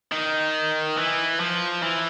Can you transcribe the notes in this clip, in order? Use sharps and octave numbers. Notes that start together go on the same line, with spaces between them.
D#3
E3
F3
E3